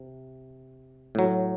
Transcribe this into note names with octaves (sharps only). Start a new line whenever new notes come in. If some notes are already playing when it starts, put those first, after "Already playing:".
Already playing: C3
A2 F#3